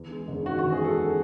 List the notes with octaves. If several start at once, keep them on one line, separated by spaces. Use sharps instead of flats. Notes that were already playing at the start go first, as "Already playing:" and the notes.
Already playing: E2
G#3
F#1
D#3 F#4
E2 F#4
G#4
G#3 A4